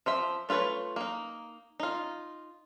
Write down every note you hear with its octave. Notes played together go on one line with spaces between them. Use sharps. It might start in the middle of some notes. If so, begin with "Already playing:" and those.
F3 C5 E5
A3 F4 A4 B4 C#5
A#3 D#4
D#4 F4